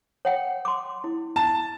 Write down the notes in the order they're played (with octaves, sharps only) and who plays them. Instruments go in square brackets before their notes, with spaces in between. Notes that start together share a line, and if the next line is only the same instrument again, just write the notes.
[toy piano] C#5 F#5 G5
C6 D6
E4
[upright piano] A5